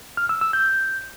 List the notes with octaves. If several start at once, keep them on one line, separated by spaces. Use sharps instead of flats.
F6
E6
E6
G6